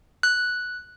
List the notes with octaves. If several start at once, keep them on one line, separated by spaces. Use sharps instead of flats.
F#6